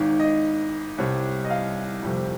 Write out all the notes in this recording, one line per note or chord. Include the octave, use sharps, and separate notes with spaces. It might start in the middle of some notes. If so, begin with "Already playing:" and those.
Already playing: G#1 G#2 D#3
D#5
C2 C3 G3 C#5
D#5
F5
G1 F2 C3 G3